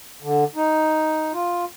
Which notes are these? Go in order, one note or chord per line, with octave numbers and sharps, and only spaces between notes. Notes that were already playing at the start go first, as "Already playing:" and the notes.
D3
D#4
F4